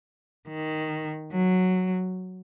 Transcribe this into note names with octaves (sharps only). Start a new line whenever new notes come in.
D#3
F#3